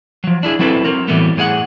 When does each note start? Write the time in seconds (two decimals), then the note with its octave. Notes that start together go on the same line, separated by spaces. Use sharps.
0.24 F3 F#3
0.43 D4 E4 G#4
0.59 F#3 C4 E4 A4 B4
0.85 F#3 C4 A#4
1.08 A2 E3 F#3 G3 A3 B3
1.37 A2 G#4 F5 F#5